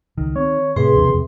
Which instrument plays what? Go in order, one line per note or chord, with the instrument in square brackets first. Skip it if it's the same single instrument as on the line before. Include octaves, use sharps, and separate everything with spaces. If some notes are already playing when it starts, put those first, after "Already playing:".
[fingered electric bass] C#2 [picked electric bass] D#3
[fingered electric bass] C4 [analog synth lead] C#5
[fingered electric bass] A2 [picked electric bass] C3 [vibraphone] G#4 B4 E5 [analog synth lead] C6
[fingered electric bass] B1 E2 D4
F2 D3